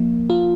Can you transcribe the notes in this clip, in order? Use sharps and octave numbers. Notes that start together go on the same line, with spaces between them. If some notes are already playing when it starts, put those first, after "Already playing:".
Already playing: F3 A#3
F4